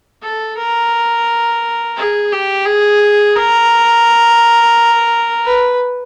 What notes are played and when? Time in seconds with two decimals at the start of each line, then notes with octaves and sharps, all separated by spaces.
0.23 A4
0.57 A#4
1.97 G#4
2.32 G4
2.66 G#4
3.36 A#4
5.45 B4